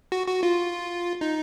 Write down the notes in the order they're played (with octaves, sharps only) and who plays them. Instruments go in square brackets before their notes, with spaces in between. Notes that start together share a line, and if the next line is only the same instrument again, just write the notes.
[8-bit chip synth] F#4
F#4
F4
D#4